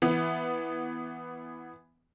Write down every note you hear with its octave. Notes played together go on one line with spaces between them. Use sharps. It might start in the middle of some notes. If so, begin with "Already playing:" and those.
E3 B3